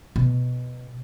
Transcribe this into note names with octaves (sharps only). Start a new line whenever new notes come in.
B2